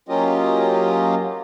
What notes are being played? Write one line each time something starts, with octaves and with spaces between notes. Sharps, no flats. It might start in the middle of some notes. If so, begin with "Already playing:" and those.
F#3 A#3 C#4 F4 G4 D#5